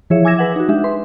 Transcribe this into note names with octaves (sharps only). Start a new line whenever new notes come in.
E3 F3 E4 G#4 C#5 E5
G#5 D6 E6 G#6 A#6 E7
G#4 B4 F#5
D#4 F#4
G#3 D4 G4 E5
B4 C6